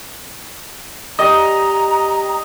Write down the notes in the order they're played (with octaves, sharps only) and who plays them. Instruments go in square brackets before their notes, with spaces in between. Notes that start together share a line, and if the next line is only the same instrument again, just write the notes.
[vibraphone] G4 G5 [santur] D#5 [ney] A#5